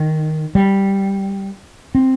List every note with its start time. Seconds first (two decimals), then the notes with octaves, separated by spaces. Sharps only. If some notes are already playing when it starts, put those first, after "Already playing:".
Already playing: D#3
0.55 G3
1.95 C4